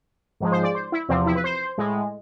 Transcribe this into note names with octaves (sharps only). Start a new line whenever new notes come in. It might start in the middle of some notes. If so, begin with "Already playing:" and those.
G#2 F3 G#3
C5
D5
C5
E4
E2 C3 F3 C4
E4
B4
C5
A2 G#3